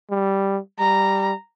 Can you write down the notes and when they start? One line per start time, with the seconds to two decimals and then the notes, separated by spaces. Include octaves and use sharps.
0.10 G3
0.79 G3 A#5